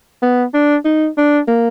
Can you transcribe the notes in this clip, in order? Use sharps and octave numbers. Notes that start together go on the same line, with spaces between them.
B3
D4
D#4
D4
A#3